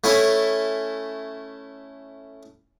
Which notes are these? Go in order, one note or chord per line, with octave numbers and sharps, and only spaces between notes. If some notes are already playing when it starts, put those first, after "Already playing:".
A3 C#4 E4